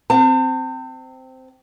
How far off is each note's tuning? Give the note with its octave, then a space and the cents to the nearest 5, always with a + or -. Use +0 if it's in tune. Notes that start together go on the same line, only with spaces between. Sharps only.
C4 -10 A5 +40